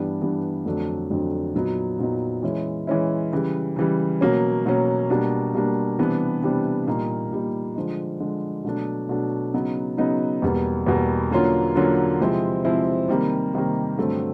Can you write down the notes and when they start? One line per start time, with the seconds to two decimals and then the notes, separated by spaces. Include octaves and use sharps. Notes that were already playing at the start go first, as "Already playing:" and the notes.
Already playing: G2 E3 G3 B3 D4
0.21 G2 E3 G3 B3 D4
0.65 F2 D3 F#3 A3 D4
1.10 F2 D3 F#3 A3 D4
1.54 A#2 F#3 B3 D#4
1.98 A#2 F#3 B3 D#4
2.43 E3 G#3 C#4 E4
2.87 E3 G#3 C#4 E4
3.32 C#3 E3 G3
3.76 C#3 E3 G3
4.21 B2 F#3 A#3 C#4
4.66 B2 F#3 A#3 C#4
5.10 B2 G3 A#3 D4
5.54 B2 G3 A#3 D4
5.98 C3 E3 G3 B3 D4
6.43 C3 E3 G3 B3 D4
6.87 A#2 G3 A#3 D#4
7.31 A#2 G3 A#3 D#4
7.76 D3 F3 G#3
8.20 D3 F3 G#3
8.64 B2 F#3 A3 D4
9.09 B2 F#3 A3 D4
9.54 C#3 F#3 B3 D#4
9.97 C#3 F#3 B3 D#4
10.42 E2 B2 G3 A#3
10.86 E2 B2 G3 A#3
11.31 D3 F#3 A#3 C#4 F4
11.75 D3 F#3 A#3 C#4 F4
12.20 C3 F3 G#3 C4 E4
12.65 C3 F3 G#3 C4 E4
13.08 C3 D#3 G3 A#3
13.54 C3 D#3 G3 A#3
13.98 G2 D3 F#3 A3 C4